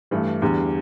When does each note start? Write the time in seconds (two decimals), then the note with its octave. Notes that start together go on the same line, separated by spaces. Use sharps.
0.11 G2 E3 A3
0.42 E2 D3 G3